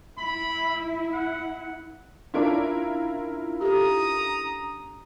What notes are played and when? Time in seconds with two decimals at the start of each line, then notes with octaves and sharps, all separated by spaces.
0.18 E4 B5
1.13 F#5
2.34 C#4 D4 E4 F4 A#4
3.61 G4 A4 A#5 D#6